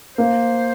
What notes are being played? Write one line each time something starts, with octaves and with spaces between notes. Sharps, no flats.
A#3 C5